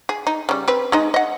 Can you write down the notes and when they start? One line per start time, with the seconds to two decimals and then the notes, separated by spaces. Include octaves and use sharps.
0.09 G#4
0.27 D#4
0.49 C#3 G3
0.68 C4 B4
0.92 G#3 D#4 D#5
1.14 D#5 F#5